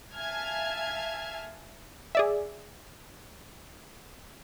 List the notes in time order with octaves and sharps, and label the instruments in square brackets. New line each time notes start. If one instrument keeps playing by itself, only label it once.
[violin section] E5 F5 G#5 A5 F6 G#6
[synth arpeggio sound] G#4 D5 E5